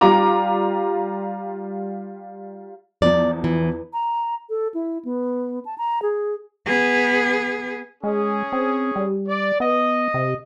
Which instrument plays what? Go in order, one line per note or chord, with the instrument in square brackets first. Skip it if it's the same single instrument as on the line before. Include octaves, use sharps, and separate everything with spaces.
[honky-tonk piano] G3 F4 A#5 D6
[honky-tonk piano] E2 F3 [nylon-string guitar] D5
[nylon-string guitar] E3
[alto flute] A#5
A4
E4
B3
A5
A#5
G#4
[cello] B3 G#4
[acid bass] G#3 [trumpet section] C#4 G#4
[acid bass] C4
G3
[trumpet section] D5
[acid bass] B3 [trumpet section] D#5
[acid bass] C3